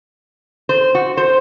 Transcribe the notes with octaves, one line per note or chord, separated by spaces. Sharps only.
C5
F#4
C5